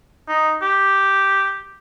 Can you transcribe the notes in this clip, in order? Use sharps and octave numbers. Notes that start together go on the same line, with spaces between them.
D#4
G4